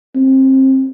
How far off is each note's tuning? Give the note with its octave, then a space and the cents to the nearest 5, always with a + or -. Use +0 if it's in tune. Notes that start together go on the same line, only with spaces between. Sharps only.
C4 +25